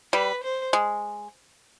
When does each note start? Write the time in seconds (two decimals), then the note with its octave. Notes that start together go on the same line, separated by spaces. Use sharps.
0.13 G3 B4
0.43 C5
0.73 G#3